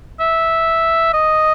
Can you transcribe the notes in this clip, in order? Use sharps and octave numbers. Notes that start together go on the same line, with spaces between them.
E5
D#5